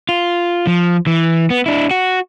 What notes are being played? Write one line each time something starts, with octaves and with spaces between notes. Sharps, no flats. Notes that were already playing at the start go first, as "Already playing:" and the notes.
F4
F3
E3
B3
D4 E4
F#4